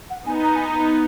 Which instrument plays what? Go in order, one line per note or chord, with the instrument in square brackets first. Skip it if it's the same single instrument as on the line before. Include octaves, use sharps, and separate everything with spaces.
[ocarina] F#5
[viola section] B3 D#4 [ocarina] G#5
[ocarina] A#5
G#5
A#5